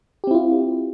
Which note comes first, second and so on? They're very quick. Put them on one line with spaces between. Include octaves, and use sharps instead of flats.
G4 C4 E4 F4